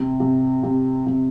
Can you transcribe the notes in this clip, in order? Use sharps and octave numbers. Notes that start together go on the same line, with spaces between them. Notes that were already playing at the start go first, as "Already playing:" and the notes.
Already playing: C3
C3
C3
C3